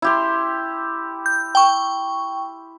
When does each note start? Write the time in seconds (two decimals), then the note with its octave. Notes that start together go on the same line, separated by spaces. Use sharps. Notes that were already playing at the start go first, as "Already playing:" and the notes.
0.02 E4 G4 C6
1.26 G6
1.55 G5 C#6